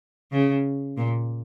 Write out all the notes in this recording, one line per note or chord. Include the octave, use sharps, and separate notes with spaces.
C#3
A#2